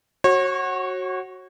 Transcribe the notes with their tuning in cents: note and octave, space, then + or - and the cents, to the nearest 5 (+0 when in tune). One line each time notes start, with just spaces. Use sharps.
F#4 +5 C#5 -35